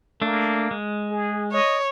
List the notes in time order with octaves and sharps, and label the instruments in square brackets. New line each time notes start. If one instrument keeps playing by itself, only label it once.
[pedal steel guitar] A3 D4 [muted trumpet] A#3
[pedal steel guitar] G#3
[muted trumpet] G#4
[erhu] C#5 [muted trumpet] D#5